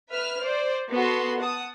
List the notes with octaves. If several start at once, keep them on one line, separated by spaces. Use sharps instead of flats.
B4 E5 F6
C5 D5
B3 F#4 A4 C6
F#5 A5 D#6